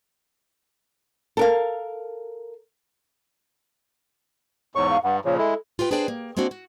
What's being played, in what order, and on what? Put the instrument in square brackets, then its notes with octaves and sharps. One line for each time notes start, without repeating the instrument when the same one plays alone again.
[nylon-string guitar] A4 A#4 F5
[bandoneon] E2 G#2 C#6 [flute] C#5
[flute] F5
[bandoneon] G2 [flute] F#5
[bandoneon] A#2 C#3 F3 [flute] C#5
[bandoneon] G#3 E4 [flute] A4
[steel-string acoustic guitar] F4 G4 B4 G5
D4 G#4 B4 C5 D5 G5
A#3
G#3 A#3 C4 D4 F#4
F#4